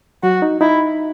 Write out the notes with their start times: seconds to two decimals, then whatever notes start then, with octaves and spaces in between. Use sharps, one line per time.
0.23 F#3 F#4
0.42 D#4
0.61 D#4 E4